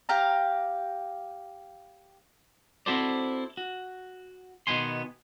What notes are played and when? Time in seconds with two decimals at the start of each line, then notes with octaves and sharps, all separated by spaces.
0.09 G4 F5 A#5
2.86 C4 E4 F#4 A4 C5 D5
3.57 F#4
4.67 B2 D#3 B3 G#5 C6